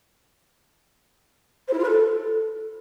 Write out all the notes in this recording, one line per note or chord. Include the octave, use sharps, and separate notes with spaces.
C5
E4
F4
B4
A4